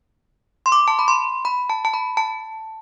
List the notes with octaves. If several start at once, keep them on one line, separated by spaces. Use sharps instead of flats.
C6
D6
A5
B5
C6
B5
A5
A5
B5
A5